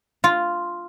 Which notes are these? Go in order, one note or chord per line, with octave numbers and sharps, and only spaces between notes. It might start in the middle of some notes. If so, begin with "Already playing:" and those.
F4